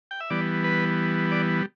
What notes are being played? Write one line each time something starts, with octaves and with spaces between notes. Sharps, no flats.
G5
E5
E3 G3 B3 D5
B4
D5